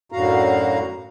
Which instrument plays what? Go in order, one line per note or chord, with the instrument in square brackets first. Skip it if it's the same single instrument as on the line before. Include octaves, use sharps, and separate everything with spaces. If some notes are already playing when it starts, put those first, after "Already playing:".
[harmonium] F#2 A2 D3 F#4 F5 A#5